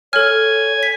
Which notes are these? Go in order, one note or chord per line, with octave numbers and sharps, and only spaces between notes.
A4 C#5 G#5 F6
B6